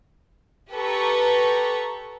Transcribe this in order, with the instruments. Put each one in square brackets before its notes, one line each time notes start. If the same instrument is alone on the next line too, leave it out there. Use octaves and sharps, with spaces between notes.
[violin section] G4 A4 B4 A#5 C#6